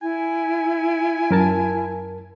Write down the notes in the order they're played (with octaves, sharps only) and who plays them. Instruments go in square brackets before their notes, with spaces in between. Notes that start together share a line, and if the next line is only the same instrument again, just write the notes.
[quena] E4 [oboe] G#5
[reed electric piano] F#2 A#4 A5